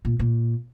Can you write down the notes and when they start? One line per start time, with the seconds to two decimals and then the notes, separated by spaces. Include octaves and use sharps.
0.05 A#2
0.19 A#2